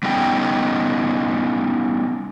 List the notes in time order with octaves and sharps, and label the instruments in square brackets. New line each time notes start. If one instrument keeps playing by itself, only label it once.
[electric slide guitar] G3 B3 C#4 D#4 G5